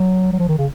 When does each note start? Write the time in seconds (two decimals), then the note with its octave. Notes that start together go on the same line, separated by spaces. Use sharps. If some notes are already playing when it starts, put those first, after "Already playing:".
Already playing: F#3
0.33 F#3
0.39 F3
0.48 D#3
0.58 C#3